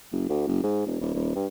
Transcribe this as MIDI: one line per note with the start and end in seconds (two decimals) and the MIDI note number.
0.12 0.25 30
0.29 0.44 38
0.47 0.59 30
0.63 0.85 44
0.86 0.99 28
1.00 1.13 27
1.14 1.32 27
1.35 1.46 43